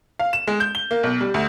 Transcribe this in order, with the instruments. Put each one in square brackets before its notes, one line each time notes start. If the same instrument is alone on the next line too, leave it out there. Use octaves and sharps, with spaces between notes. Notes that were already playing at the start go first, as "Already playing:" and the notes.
[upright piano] F5
E7
G#3
G6
G7
A#3
B1
G3
D2